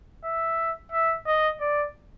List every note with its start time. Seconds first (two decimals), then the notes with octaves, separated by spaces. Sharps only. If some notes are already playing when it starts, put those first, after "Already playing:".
0.24 E5
0.92 E5
1.27 D#5
1.61 D5